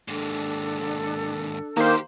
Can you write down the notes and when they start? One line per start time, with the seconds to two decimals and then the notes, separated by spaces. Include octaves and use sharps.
0.08 D#2 G#2 D4 A4
1.77 D#3 A#3 F#4 G4 C5